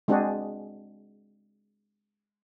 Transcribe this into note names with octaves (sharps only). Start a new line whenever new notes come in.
G#3 C4 D4 F#4 G#4